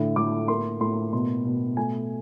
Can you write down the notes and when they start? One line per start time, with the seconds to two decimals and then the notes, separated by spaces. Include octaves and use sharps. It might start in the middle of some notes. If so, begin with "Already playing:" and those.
Already playing: A2 D3
0.16 A2 D6
0.48 A#3 C6
0.80 A2 C6
1.13 B2 C6
1.45 B2
1.77 A3 G#5